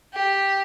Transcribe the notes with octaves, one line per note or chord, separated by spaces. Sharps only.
G4